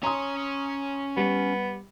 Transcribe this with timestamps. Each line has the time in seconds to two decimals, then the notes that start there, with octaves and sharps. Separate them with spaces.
0.03 C#4 C#5 A#5 C6 D#6
1.17 G3 B3